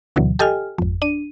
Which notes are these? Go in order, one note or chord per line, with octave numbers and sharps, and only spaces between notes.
D2 B2 D3 E3 F#3
G4 A4 D#5 G5 G#5 F6
G#1 F2
D4 D#7